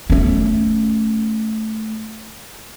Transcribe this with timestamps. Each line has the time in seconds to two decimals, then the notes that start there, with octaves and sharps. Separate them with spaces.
0.10 A3 C#4